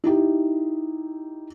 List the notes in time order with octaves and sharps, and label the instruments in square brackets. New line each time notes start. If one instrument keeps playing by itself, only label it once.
[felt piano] D#4 E4 G4